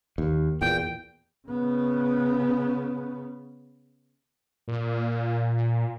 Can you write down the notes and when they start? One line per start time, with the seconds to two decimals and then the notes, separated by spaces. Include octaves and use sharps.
0.18 D#2
0.61 E2 A#2 G5
1.48 C#3 B3
4.68 A#2